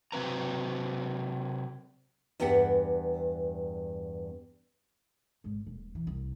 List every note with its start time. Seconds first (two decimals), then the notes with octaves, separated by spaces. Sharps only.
0.12 C3 F#3 C4 B4 A#5
2.40 E2 G2 B3 G4 F#5
5.44 G#1
5.67 D#1
5.95 E3
6.07 C2